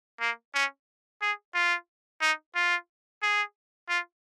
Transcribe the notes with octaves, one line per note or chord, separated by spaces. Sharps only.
A#3
C#4
G#4
F4
D#4
F4
G#4
F4